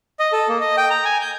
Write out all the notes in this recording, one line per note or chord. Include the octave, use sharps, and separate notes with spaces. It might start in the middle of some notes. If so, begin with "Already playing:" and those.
D#5
A4
A#3
D#5
G5
A#5
G#5
G6